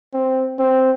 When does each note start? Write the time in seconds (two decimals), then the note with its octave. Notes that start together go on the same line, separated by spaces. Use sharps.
0.14 C4
0.59 C4